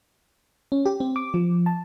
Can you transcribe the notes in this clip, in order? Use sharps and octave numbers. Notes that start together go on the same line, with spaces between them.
C#4
G4
C4
D6
F3
A5